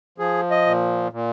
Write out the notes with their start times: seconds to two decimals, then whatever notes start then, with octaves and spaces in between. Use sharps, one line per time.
0.18 F3 G#4
0.50 D#5
0.66 A#2
1.12 A#2